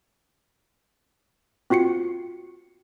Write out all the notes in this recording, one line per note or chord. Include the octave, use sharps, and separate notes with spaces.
C4 F4 F#4 C7 C#7